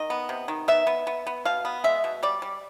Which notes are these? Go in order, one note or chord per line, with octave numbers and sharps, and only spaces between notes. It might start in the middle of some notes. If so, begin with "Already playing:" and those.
Already playing: D#3 D#5
B3
C3
D#3
B3 E5
B3
B3
B3
B2 F5
B3
G#3 E5
B2
G3 D5
G3